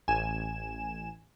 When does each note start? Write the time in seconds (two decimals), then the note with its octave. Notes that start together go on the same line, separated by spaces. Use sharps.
0.08 A1 G#5 E7